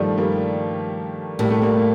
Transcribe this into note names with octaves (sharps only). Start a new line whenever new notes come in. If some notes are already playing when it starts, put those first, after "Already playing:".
Already playing: G2 D#3 F3 G3 A3
G3 A#3
A2 G3 A#3
A3
G3 A#3
A#3